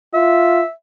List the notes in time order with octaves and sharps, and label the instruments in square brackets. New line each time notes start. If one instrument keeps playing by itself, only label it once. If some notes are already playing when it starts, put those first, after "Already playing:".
[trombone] F4 [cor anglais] E5